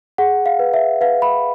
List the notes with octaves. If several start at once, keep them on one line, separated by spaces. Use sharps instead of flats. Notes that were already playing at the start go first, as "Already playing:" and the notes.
G#4 F#5
F5
B4
E5
B4 F5
B5